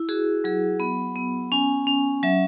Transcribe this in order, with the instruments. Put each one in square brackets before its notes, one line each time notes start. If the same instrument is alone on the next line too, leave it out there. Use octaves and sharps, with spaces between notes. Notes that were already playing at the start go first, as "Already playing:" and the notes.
Already playing: [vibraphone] E4
F#4 G#4
F#3 G#4
B3 B5
B3
C#4 G#5
C#4
F#3 E5